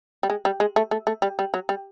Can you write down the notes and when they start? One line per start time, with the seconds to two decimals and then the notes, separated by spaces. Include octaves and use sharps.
0.23 G3
0.30 G#3
0.45 G3
0.60 G#3
0.76 A3
0.91 A3
1.07 A3
1.22 G3
1.39 G3
1.54 F#3
1.69 G3